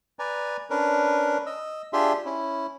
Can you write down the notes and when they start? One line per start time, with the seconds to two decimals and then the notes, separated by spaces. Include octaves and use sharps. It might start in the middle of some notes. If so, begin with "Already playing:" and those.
0.19 B4 D5 G#5 A#5
0.70 C#4 D4 A#4 B4
1.46 D#5 E6
1.93 D4 F4 G4 G#4 E5 C6
2.25 C#4 E4